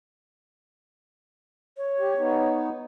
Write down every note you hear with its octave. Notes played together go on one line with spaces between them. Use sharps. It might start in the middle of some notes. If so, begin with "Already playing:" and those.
C#5
G4
B3 D#4